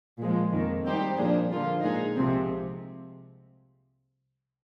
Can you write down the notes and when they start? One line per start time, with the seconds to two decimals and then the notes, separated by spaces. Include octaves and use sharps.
0.19 A#2 F3 G#3
0.52 F2 D#3 A#3
0.85 G3 C4 D#4 G4 C5
1.17 A#2 F3 A#3 D4 G#4
1.51 D3 F3 A#3 F4
1.83 A#2 G#3 D#4 G#4
2.16 C2 C3 F3 G#3 C4